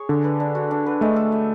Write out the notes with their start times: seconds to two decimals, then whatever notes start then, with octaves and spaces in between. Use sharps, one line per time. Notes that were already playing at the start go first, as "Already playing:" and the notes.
Already playing: G#4 C#5
0.09 D3 D4
0.24 B4
0.40 D4
0.55 F#4
0.71 D4
0.86 B4
1.01 G#3 A3
1.16 A4
1.32 E5